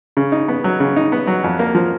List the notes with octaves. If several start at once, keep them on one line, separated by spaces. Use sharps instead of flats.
C#3
D#4
B3
F#3
C#3
D#4
B3
F#3
F2
A#3
F3